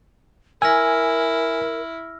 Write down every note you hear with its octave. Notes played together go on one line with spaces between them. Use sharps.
E4 A#4 G#5 E6 F6 A#6